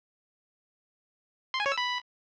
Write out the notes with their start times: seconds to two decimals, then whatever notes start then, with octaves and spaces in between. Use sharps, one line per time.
1.54 C6
1.60 G#5
1.66 C#5
1.72 E6
1.78 B5